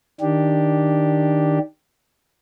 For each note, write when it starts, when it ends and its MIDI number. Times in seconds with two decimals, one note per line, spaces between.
0.21 1.59 51
0.21 1.59 62
0.21 1.59 67